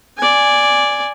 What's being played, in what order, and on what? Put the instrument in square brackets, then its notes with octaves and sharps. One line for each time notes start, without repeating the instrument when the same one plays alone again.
[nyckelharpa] D5 G#5